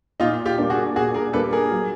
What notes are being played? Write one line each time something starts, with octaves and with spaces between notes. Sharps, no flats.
A#2 D#4 F4
F4 G4
G3 A#3 D4
F#4 G#4
A#2 F#4 G#4
G#4 A#4
G3 A#3 D4 A4 B4
G#4 A#4
F#3